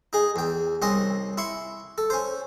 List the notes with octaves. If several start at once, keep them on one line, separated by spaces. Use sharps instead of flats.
D#4 G#4
E2 G5
C2 C4 C#4 D#5 C6
E4 C6 C#6
A4
C#4 C5